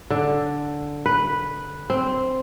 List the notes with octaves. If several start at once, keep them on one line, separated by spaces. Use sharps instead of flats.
D3
B4
C4